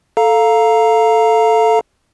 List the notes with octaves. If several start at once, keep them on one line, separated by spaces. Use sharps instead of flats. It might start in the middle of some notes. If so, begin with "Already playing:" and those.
A4 F5 A#5